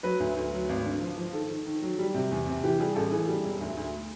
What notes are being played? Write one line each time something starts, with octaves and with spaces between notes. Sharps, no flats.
F#3 B4
D2
D2
F#3
G#1
D3
F3
F3
D#3 A4
D#3
D#3
F#3
G3
C3
E2
C3
E3 G4
G3 G#4
A1 A4
E3 G#4
G3
E1
D2
D2